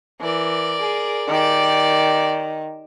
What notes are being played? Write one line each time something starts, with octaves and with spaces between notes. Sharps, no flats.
E3 A#4 D5
G#4
D#3 G4 D5